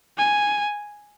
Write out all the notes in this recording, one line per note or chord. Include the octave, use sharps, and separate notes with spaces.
G#5